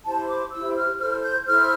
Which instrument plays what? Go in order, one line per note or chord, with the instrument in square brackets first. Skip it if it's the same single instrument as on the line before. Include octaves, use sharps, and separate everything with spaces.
[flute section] E4 G4 C5 A5
D6
E4 G4 C5 E6
F6
E4 A4 C5 F6
G6
E4 A4 C5 F6